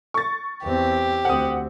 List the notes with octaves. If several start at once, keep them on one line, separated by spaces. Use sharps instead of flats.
C#6 A6
E2 C4 G4
D2 C4 F#5 D#6